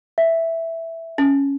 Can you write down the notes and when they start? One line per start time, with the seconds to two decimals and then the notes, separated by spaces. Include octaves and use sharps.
0.18 E5
1.18 C#4